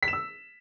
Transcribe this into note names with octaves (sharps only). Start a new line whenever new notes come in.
B6
E7
E6